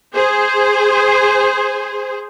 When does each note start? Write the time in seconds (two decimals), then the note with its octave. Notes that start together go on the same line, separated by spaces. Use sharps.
0.14 G#4 C5